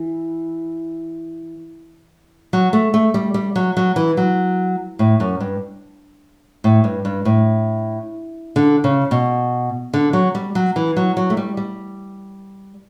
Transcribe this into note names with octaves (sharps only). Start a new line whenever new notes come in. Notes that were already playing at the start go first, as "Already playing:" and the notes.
Already playing: E3
F#3
A3
A3
G3
G3
F#3
F#3
E3
F#3
A2
F#2
G2
A2
G2
G2
A2
D3
C#3
B2
D3
F#3
G3
F#3
E3
F#3
F#3
A3
G3
G3